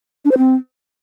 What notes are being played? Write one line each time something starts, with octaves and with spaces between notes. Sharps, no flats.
D4
C5
C4